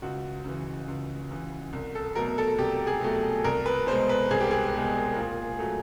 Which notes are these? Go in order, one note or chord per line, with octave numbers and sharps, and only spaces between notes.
C#2 F#4
C#3 E3
C#2
C#3 E3
C2
A4
B2 F#3 A3 A#4
A4
C2 G4
G#4
B2 F#3 A3
C2 A#4
B4
B2 G#3 C5
B4
C2 G#4
G4
G#4
B2 G#3
A#2
F#3 A3